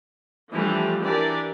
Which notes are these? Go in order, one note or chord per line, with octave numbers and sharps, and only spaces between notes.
E3 F3 G3 A3 D4
E3 D4 G4 A#4 D5